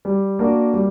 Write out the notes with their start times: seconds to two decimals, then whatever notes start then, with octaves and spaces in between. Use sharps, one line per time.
0.05 G3
0.39 A#3 D4 F#4 A#4
0.74 G3